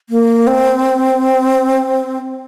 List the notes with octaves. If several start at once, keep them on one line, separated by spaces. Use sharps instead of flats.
A#3
C4